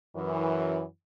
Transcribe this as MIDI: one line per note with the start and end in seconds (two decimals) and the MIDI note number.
0.16 0.82 42
0.16 0.82 52